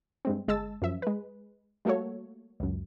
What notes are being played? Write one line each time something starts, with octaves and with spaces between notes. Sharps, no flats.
G2 G#3 C4
G1 G#3 A5 E6 A6
F#2 F3 E5
G#3 B4
G3 A3 A#3 F#4 A4 C#5
C#2 F#2